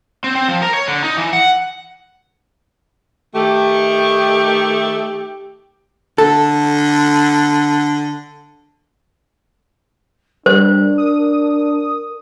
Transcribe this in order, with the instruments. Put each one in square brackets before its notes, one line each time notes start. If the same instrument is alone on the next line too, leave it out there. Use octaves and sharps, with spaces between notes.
[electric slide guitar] C4
C4
F3
A#4
C#5
D3
D#4
E3
F#5
[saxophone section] D#3 A3 [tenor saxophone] G4
[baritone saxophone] D3 [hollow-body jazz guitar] A4
[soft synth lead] G3 [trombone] D4 [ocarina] A#4 [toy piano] C5
[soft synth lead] D#6